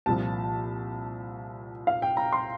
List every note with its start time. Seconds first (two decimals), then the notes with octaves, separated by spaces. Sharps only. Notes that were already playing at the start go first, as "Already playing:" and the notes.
0.06 C2 A#2 F3 A5
1.87 F5
2.02 G5
2.17 A#5
2.33 C6